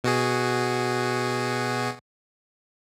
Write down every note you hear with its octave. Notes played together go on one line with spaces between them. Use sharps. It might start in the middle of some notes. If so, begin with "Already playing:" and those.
B2 F#4 G#4